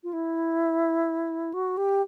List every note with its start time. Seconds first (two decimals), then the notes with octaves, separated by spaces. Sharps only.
0.04 F4
0.13 E4
1.54 F#4
1.77 G4